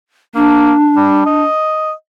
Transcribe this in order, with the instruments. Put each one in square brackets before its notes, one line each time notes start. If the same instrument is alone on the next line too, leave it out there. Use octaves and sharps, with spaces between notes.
[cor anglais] A#3 [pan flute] D4
[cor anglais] G3
D#5